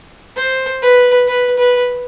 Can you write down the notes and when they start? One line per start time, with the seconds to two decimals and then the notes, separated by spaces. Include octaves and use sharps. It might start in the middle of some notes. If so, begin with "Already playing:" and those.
0.37 C5
0.82 B4
1.28 B4
1.58 B4